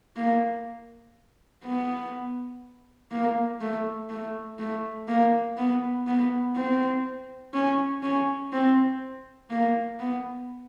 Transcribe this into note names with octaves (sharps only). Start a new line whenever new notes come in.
A#3
B3
A#3
A3
A3
A3
A#3
B3
B3
C4
C#4
C#4
C4
A#3
B3